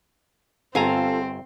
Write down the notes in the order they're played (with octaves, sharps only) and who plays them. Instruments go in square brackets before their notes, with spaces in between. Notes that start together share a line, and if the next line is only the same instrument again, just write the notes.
[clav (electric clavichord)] G1 G#5 A#5 [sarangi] C4 [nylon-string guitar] F4 A4 F5